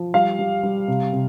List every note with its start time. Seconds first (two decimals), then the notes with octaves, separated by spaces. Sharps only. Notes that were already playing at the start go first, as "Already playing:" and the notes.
Already playing: F3
0.14 G3 F5
0.39 G3
0.63 G3
0.88 C3
1.13 C3